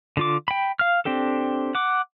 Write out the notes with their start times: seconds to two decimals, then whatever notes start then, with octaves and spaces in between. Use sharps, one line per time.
0.17 D3 F4 D6
0.48 G5 B5
0.79 F5 F6
1.05 C4 D4 G4 A4
1.75 F#5 D6